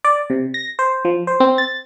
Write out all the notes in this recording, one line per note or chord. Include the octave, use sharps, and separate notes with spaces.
D5
C3
A#6
C5
F3
C5
C4
A6